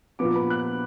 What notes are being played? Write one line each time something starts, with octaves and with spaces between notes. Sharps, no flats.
A#2 F3 B3 D6
B5
F#6